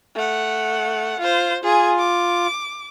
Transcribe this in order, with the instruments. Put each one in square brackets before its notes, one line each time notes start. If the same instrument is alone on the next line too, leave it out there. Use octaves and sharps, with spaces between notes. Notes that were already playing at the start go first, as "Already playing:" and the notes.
[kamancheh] A3 F#5
F4 C5
[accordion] F4 [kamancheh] G#4 G#5
[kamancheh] D6